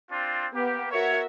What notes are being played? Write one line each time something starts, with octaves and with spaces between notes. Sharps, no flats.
C4 D4 F4
A#3 B3 G4
F#4 A#4 C#5 E5